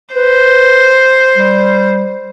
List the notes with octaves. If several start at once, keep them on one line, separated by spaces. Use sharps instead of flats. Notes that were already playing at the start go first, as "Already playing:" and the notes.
B4 C5
G3